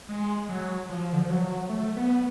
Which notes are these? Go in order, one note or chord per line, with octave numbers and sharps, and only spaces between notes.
G#3
F#3
F3
D3
F3
F#3
A3
B3